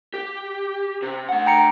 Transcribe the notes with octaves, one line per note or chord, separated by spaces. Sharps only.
G4
C3
A3 F#5
G5 A#5 C#7